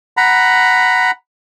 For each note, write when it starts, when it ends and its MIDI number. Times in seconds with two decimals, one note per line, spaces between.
0.17 1.11 78
0.17 1.11 82
0.17 1.11 83